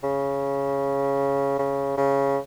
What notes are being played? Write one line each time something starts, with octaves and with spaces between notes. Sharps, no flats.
C#3
C#3
C#3